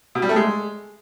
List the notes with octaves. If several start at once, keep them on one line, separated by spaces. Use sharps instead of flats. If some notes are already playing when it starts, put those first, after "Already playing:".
B2
G3
A3
G#3